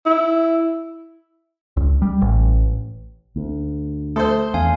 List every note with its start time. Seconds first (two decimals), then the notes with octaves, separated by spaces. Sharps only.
0.06 E4
1.77 C#2
2.02 G3
2.22 A1
3.36 D2
4.16 A3 A4 C5 C6
4.54 E2 F5 G#5